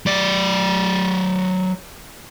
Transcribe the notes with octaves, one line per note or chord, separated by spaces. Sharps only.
F#3 D5